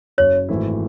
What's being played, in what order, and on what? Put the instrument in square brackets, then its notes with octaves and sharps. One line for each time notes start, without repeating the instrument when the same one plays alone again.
[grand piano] F#1 F#2 C#3 [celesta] C#5
[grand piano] G#1 G#2 E3 A3 E4